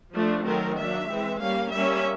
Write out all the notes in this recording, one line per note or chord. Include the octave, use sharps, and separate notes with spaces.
F3 A3 D4
D#3 F#3 A3 C4 A#4
F#3 A#3 D4 E5
E3 G#3 C4
G3 A#3 C#4 F5
G3 A#3 C#4 E5